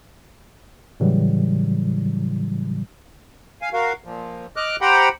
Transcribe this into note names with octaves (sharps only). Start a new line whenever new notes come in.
A2 C#3 E3 F#3 G3
F5 G#5
F#4 A#4 F5
A#2 F3
D#5 D6 F6 F#6
G4 C5 F#5 G5 A#5 B5